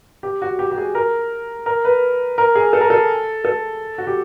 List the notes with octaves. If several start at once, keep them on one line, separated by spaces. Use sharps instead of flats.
G4
F#4
G4
G4
G#4
A#4
A#4
B4
A#4
G#4
A4
A#4
A4
A4
F#4
G4